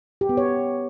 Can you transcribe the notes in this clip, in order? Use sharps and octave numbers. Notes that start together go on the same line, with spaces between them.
G4
B3
C#5